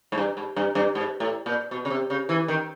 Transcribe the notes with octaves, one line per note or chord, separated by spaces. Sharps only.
G#2
G2
G#2
G2
G2
G#2
A2
A#2
B2
C#3
C3
C#3
E3
D#3